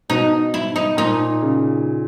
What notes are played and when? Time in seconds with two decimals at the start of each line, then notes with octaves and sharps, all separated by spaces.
0.10 B2 D#4
0.54 E4
0.76 D#4
0.97 A#2 D#4
1.42 C#3